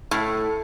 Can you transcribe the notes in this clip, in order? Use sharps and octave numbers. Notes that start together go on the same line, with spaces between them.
A2